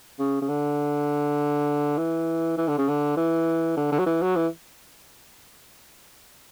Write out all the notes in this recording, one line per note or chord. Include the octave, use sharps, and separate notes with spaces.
C#3
C#3
D3
E3
E3
D3
C#3
D3
E3
D3
D3
F#3
E3
F#3
E3